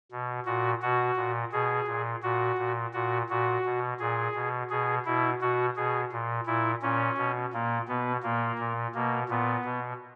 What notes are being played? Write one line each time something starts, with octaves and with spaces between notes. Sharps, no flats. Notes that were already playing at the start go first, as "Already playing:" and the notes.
B2
A#2 F#4
B2 F#4
A#2
B2 G#4
A#2
A#2 F#4
A#2
A#2 F#4
A#2 F#4
B2
A#2 G#4
B2
B2 G#4
B2 E4
B2 F#4
B2 G#4
A#2
A#2 E4
A#2 C#4
B2
A#2 A#3
B2 B3
A#2 A#3
A#2
B2 A#3
A#2 B3
B2